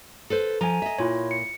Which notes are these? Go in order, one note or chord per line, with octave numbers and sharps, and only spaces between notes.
A4 B4 C5
F3 G#5 A#5
D#5 E5
A#2 E4 F4 C#5
C#7